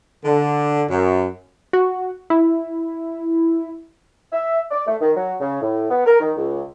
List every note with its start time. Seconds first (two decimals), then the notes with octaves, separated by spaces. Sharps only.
0.25 D3
0.89 F#2
1.73 F#4
2.30 E4
4.32 E5
4.71 D5
4.87 A3
5.01 D#3
5.16 F#3
5.40 C#3
5.62 A2
5.90 B3
6.07 A#4
6.20 D#3
6.37 C#2